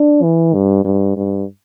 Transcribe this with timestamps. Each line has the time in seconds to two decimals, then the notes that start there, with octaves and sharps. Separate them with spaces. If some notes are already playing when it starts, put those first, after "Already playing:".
Already playing: D4
0.22 E3
0.54 G2
0.84 G2
1.16 G2